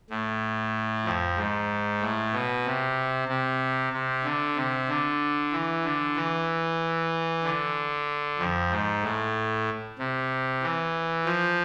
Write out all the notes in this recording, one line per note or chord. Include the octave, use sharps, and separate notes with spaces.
A2
F2
G#2
A2
B2
C3
C3
C3
D3
C3
D3
E3
D3
E3
D3
F2
G#2
A2
C3
E3
F3